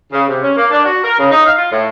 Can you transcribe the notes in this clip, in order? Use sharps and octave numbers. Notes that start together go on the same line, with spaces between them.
C#3
C3
C#4
A#3
D4
F#4
A#4
C#3
D#4
F5
F4
A2